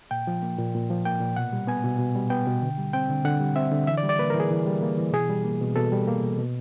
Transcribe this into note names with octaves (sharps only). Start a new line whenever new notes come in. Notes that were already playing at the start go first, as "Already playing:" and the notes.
A#2 G5
F3
A#3
A#2
A#2
F3
A#3 G5
A#2
B2 F#5
G3
B3 G#5
B2
B2
G3
B3 G5
B2
D3
G3
C4 G5
D3
D3 F#5
G3
C4 E5
D3
E3 E5
D5
G3
D5
A#3 B4
A#4
E3
G#4
E3
G3
A#3
E3
B2 G#4
G3
A#3
B2
B2 A4
G3
A#3
B2
B2